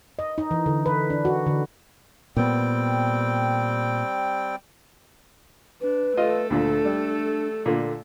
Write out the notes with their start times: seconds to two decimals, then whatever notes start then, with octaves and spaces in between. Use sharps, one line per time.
0.19 D#5
0.38 D#4
0.51 E3
0.66 D3
0.86 B4
1.10 D4
1.25 F#4
1.46 D3
2.37 A#2 G3 B3 C4 G5
5.81 D4 B4
6.17 A3 F4 A4 D#5
6.50 D2 A#2 D4
6.85 G3
7.66 A#2 D3